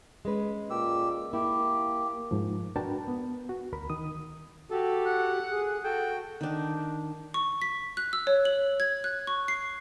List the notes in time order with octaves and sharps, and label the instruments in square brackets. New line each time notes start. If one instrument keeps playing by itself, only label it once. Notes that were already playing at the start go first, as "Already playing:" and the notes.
[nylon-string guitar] G#3 C#4 B4
[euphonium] A#2 [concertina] G4 E6
[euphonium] A#3 [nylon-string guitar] E4 [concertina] G4
[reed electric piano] G#2 F3
D4 F#4 A#4 B4 G5 A5
B3
F#4
D2 A#4 B5
D#3 D#6
[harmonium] F#4 G4 [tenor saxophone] A4
[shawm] F#5
[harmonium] G#4
[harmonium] F#4 [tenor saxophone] A4 [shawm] G5
[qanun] D#3 D4
[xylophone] C#6
B6
F#6
E6
C#5
F#7
G#6
F#6
C#6
C7